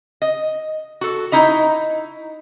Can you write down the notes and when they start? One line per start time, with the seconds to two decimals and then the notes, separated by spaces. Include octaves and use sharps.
0.22 D#5
1.01 F#4 A4
1.32 D#4 E4 D#5